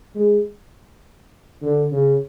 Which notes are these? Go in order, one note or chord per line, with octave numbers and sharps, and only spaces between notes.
G#3
D3
C#3